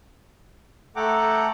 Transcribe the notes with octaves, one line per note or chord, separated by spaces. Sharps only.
A3 A4 F#5 G5 A#5 D6